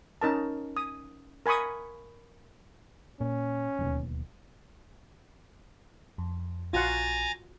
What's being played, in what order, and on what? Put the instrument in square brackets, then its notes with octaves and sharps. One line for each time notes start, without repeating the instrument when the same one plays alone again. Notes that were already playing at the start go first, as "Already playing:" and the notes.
[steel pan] C#4 D#4 A#4 A5
D#6
A#4 G#5 B5 C#6 D#6
[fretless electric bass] A#2 [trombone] C#4
[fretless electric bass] D1 D#2 B2
[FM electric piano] F2
[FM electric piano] A#1 [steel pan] F4 F#4 F#5 [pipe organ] G#5 A#5 A6